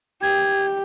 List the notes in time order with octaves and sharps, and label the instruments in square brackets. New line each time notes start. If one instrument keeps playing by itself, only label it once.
[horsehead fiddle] G4 [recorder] G#6